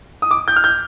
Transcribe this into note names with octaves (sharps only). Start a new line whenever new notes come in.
D#6
D6
G6
F6
G6